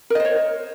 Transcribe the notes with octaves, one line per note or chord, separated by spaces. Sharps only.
A#4 C5 C#5 D#5